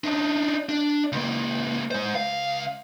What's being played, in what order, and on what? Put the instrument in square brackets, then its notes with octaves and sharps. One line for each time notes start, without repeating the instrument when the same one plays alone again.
[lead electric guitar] D4 D#4
D4
C#2 A#3
G#3 C5
C#2 F5